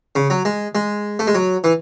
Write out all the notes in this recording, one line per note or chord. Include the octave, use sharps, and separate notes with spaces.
C#3
F#3
G#3
G#3
A3
G#3
F#3
E3